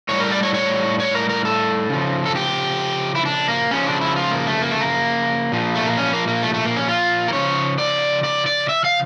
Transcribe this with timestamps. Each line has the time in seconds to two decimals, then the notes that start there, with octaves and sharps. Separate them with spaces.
0.09 A2 E3 C#5
0.13 G3
0.20 A#4
0.32 D5
0.43 C#5
0.54 C#5
1.00 C#5
1.15 A#4
1.30 A#4
1.45 A4
1.90 C#3 F3
2.26 A4
2.36 G4
3.15 E4
3.25 D4
3.48 A#3
3.71 C#3 F3 C#4
3.86 D4
4.01 E4
4.16 F4
4.32 A#3
4.47 A3
4.62 A#3
4.71 A3
4.81 A#3
5.52 A#2 F3
5.75 A3
5.86 A#3
5.97 C#4
6.13 A#3
6.28 A#3
6.42 A3
6.54 A3
6.65 A#3
6.76 C#4
6.88 F4
7.28 A#4
7.33 C#3 F3 C#5
7.78 D5
8.24 D5
8.46 D5
8.69 E5
8.85 F5